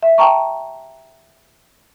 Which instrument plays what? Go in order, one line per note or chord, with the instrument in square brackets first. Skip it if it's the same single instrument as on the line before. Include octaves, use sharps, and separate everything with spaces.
[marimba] E5
G5 A5 A#5 C#6